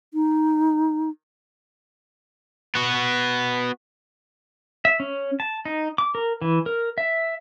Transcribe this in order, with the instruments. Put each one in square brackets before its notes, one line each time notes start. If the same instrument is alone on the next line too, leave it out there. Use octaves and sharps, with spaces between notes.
[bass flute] D#4
[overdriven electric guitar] B3 F#4
[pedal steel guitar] E5
C#4
A5
D#4
D6
A#4
E3
A#4
E5